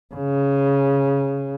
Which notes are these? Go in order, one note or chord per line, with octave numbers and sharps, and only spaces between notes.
C#3